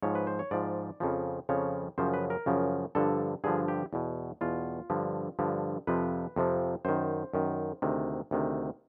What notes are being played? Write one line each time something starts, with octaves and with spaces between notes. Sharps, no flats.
G#2 F3 C#5
B4
C5
C#5
G#2 F3 D5
F2 C#3 F3
F2 C#3 F3 C#5
F#2 C#3 F3 C5
B4
A#4
F#2 C#3 F3
G2 D3 F3 A4
G2 D3 F3 G#4
G4
E2 B2
E2 B2 F4
G2 D3 F3
G2 D3 F3
F2 C3 F3 B4
F2 C3 F3
F#2 D#3 C5
F#2 D#3
D2 C3 D#3
D2 C3 D#3